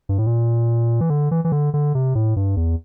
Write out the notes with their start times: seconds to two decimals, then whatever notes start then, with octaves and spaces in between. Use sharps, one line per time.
0.09 G2
0.18 A2
0.27 A#2
1.01 E3
1.10 D3
1.31 E3
1.45 E3
1.52 D3
1.74 D3
1.95 C3
2.15 A2
2.36 G2
2.57 E2